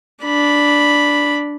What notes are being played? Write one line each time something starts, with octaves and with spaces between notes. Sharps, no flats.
D4 B5